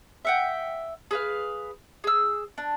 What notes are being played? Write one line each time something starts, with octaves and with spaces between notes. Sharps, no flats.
E5 F#5 G5
G#4 B4 F5
G#4 E6
D4